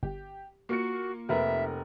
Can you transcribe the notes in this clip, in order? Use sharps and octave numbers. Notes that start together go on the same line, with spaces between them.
G1 G4
A#3 F4 F#4 C#7
F1 A#4 B4 E5